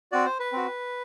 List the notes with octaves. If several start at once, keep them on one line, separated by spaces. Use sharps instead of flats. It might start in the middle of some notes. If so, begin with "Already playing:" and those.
C4 F#4 D5
C5
B4
C4 F#4